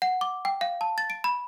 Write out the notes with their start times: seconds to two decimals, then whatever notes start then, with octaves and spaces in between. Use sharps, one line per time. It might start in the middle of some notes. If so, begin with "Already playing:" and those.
0.02 F#5
0.21 D6
0.45 G5
0.61 F5
0.81 A5
0.98 A6
1.10 D7
1.24 B5